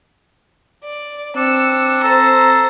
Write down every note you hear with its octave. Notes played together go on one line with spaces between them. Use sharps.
D5
C4 D4 E6 C#7
A4 C5 A#5